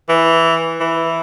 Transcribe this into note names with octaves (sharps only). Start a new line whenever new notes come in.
E3
E3